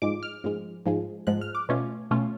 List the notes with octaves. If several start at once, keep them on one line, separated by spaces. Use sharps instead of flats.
G#2 F3 G#3 D6
F6
G#2 F3 G#3
G#2 F3 G#3
G#2 F3 G#3 F#6
F6
D6
B2 A3 C#4 F4
B2 A3 C#4 F4